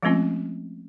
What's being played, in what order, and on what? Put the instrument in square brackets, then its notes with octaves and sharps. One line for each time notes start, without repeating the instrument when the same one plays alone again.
[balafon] F3 G#3 A3 C4 C#4 F4